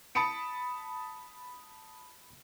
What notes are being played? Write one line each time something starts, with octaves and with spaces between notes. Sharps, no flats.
A5 B5 D#6 C#7 D7